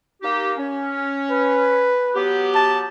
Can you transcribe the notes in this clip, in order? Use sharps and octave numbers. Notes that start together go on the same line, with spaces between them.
A#3 D#4 G4
C#4
B4
F#3 B3 G4
A5